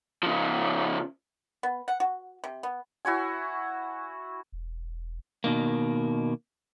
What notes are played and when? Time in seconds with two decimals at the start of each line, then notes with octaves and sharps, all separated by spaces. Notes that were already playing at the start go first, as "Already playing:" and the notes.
0.23 C#3 F3
1.63 B3
1.88 F#5
2.00 F#4
2.44 C3
2.63 B3
3.05 E4 F#4 C#5 G#5
4.52 E1
5.44 B2 D#3 A#3